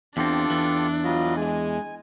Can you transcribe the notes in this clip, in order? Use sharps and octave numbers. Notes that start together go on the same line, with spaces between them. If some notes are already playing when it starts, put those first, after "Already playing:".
E2 C4 D4 F4 G4 A4
E2 E3
F#3 G3 F4 D#5
G#3 G#5